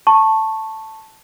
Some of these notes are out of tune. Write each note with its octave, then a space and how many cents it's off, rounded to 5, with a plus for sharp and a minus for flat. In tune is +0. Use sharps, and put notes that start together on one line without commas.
A5 +5 C#6 -15